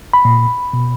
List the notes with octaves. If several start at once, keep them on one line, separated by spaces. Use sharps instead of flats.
B5
A#2
B2